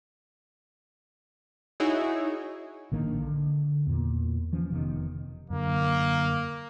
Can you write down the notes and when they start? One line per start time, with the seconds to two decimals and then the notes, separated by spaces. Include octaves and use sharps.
1.80 D#4 E4 F#4 G#4 C#5
2.92 A#1 D#3 A#3 D4
3.20 D3
3.87 E2 A#2
4.53 E3 F3 C#4
4.71 F1 C3 D#3 B3
5.50 F#2 D3 A#3